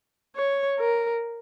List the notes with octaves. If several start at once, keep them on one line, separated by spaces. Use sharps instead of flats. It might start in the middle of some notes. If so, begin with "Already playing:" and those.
C#5
A#4